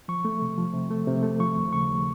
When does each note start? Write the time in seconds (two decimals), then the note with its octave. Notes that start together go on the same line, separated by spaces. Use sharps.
0.08 F3 C#6
0.25 A3
0.41 C3
0.57 F3
0.74 C3
0.91 A3
1.07 C3
1.23 A3
1.40 F3 C#6
1.57 D#2
1.73 C#3 C#6
1.88 D#2